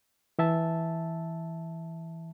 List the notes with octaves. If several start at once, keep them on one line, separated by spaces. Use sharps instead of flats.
E3 E5 A5